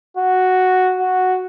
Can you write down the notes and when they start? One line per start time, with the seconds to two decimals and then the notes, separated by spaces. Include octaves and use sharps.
0.17 F#4
1.00 F#4